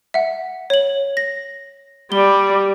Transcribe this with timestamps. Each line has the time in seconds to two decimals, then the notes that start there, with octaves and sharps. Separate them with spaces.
0.14 E5 F#5
0.70 C#5 F#7
1.17 A#6
2.12 G3 D5 G7